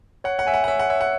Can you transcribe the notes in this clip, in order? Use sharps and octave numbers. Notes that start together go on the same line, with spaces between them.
C#5 F#5
F#5
E5 G#5
F#5
F#5
C#5 E5
F#5
C#5 E5
F#5